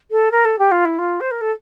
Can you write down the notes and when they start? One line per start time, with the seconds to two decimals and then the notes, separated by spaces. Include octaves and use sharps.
0.11 A4
0.31 A#4
0.45 A4
0.58 G4
0.71 F4
0.85 E4
0.98 F4
1.20 C5
1.31 A#4
1.41 A4